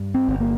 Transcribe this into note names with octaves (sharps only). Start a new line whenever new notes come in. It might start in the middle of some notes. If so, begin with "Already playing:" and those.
Already playing: G2
C4
G1
A#3